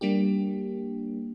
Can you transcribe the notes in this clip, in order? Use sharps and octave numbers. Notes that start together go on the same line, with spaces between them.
G3 A#3 D4 G4